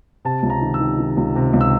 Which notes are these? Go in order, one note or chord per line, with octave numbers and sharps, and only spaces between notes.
C3 A5
C#2
A#5
D#3
E6
D#3
D#3
C#2
C3
C#2
E6